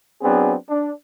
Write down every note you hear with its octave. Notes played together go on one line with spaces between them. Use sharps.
F#3 B3 C4 D4 G#4
D4